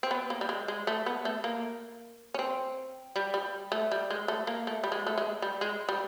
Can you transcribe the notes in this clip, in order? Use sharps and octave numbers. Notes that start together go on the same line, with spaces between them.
C4
B3
A#3
G3
G#3
G#3
A3
B3
A3
A#3
C#4
C4
G3
G3
A3
G3
G#3
A3
A#3
A3
G3
G#3
A3
G#3
G3
G#3
G3